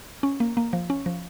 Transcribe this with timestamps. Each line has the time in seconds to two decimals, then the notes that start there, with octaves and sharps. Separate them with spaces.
0.23 C#4
0.40 A#3
0.57 A#3
0.73 F3
0.90 C#4
1.06 F3